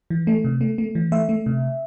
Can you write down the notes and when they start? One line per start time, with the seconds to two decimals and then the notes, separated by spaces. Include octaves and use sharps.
0.10 E3
0.27 A3
0.44 C3
0.61 A3
0.78 A3
0.95 E3
1.12 A3 E5
1.29 A3
1.46 C3